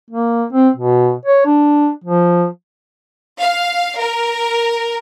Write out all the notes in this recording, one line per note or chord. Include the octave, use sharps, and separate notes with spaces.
A#3
C4
B2
C#5
D4
F3
F5
A#4